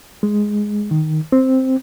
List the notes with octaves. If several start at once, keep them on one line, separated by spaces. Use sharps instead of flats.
G#3
D#3
C4